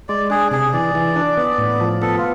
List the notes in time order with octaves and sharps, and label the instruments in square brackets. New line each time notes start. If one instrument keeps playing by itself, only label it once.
[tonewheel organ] G#3 [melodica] D5
[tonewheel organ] D4 [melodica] G#4
[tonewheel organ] C3 [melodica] G#4
[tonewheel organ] E3 [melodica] D5
[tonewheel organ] E3
D4
B3
A2
F3
[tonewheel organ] B3 [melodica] A4
[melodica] F4